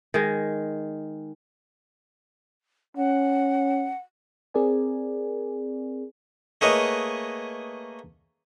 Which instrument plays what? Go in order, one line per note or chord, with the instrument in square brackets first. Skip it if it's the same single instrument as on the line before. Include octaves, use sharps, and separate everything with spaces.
[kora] D#3 G#3
[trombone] C#4 [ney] F#5
[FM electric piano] C4 G#4 A#4 D5 G#5
[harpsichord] A3 A#3 G#4 B4 C#5 D#5